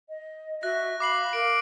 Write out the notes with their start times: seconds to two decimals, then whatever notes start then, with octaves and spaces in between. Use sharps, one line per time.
0.09 D#5
0.63 F#4 E5 F#6 A#6
1.00 F5 B5 D6 C7 F#7
1.33 A#4 D7